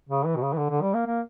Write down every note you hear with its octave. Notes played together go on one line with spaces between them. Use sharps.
C#3
E3
B2
C#3
E3
D3
D3
G3
A#3
A#3